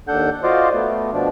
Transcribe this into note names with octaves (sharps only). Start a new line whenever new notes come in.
D#2 D4 A4 F#5 G6
F4 F#4 C5 D5 D#5 F5
A3 B3
B2 F3 D4